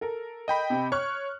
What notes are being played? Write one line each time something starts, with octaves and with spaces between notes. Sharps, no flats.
A4 A#4
D#5 G5 B5
C3
C#5 C#6 F6 F#6